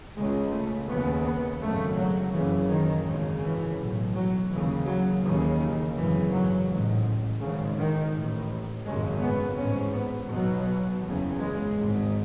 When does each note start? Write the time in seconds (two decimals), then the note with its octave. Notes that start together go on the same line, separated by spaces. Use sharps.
0.16 C#2 C#3 G#3
0.52 A3
0.88 D#2 C#3 B3
1.24 B3
1.60 G#1 F#2 C#3 A3
1.96 F#3
2.33 F#1 F#2 C#3 E3
2.69 D#3
3.06 G#1 F#2 C#3
3.42 E3
3.78 B1 A2
4.14 F#3
4.50 D#2 C#3 E3
4.86 F#3
5.23 D#2 C#3 E3
5.59 D#3
5.95 G#1 F#2 C#3 E3
6.31 F#3
6.67 A1 G#2
7.40 G#1 G#2 C#3
7.77 D#3
8.12 A1 A2
8.85 G#1 F#2 C#3 G#3
9.21 B3
9.56 A1 G#2 C#4
9.93 B3
10.29 B1 B2 F#3
11.02 F#1 E2 C#3
11.38 G#3
11.74 G#1 G#2